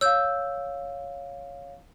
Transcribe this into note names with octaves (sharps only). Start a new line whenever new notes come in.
C#5 F5 E6 G6